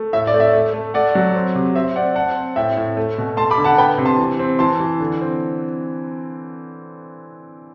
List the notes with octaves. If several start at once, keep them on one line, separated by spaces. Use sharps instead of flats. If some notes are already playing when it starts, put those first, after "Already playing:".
Already playing: A3
A2 E5
D5
A3
E5
A3
A3
A3 D5 F#5
F#3
C4
C3
C4 E5
C4 D5 F#5
C4 F#5 A5
C4
A2 E5 G5
A2
A3
B2
A3 A5 C6
B5 D6
D3
F#5 A5
B3 G5 B5
C3
A5 C6
E3
C4
E3 A5 C6
E3
D3
C4